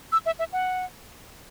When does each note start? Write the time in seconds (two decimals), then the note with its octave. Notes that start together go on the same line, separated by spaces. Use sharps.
0.12 E6
0.26 E5
0.39 E5
0.53 F#5